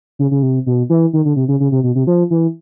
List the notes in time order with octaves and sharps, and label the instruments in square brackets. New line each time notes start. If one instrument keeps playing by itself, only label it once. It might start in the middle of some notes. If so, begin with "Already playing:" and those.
[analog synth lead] C#3
C#3
C3
B2
E3
D#3
D3
C3
C#3
C#3
C3
B2
C3
F3
E3